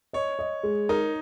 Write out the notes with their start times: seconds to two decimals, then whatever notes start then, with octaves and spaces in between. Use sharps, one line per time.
0.13 C#5 D#5
0.39 D#5
0.63 G#3
0.89 D#4 A#4